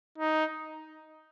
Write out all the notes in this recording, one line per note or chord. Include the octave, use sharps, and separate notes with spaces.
D#4